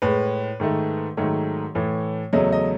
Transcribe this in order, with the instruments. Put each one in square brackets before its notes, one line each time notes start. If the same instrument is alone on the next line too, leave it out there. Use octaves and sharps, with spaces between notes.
[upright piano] A2 G#3 B4
G#2 D#3 A3
G#2 D#3 F#3 A3 C#5
A2 E3 A3
E2 C#3 F#3 A3 D#5
D#5